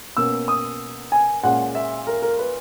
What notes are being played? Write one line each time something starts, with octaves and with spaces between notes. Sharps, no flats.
B2 A#3 C#4 E6
D#6
G#5
A#2 G#3 C#4 F#5
E5
A#4
A#4
B4